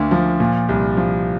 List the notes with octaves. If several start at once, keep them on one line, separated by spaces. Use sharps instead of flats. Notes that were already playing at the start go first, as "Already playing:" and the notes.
Already playing: D2 D3 A#3 D4
F3
A#2
C2
F3